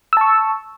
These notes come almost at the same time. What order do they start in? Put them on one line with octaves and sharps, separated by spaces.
E6 A5 C#6